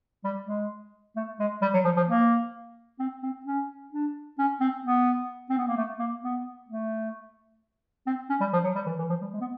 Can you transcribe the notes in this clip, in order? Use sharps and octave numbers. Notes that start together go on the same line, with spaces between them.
G3
G#3
A3
G#3
G3
F#3
F3
F3
A#3
C4
C4
C#4
D4
C#4
C4
B3
C4
B3
A#3
A3
A#3
B3
A3
C4
C#4
G3
F3
F#3
G3
E3
E3
F3
G3
G#3
B3